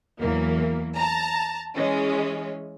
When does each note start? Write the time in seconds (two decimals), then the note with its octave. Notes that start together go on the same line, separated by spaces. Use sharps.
0.20 E2 E3 F#3 A#3
0.96 A5 A#5
1.76 E3 G#3 C#4